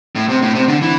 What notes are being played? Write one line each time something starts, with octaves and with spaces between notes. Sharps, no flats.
A2
C3
A2
C3
D3
E3